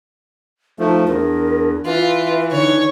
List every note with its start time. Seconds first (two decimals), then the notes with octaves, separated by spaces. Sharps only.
0.79 F3 A3 D#4
1.08 E2 D4 A#4
1.86 E3 F4 B4 E5
2.52 D3 D#4 C#5